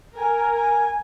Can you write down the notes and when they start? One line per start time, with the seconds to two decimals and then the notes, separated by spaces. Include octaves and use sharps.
0.16 A#4 G#5
0.57 G#5